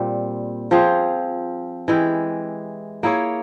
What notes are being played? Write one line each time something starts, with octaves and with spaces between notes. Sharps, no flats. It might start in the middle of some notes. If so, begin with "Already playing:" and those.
Already playing: A#2 G3 C4
F3 C4 F4 G#4
E3 G#3 E4 G4
A#3 E4 G#4 C#5